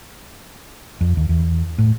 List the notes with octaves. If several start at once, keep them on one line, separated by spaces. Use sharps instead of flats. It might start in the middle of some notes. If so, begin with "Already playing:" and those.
F2
D#2
E2
A2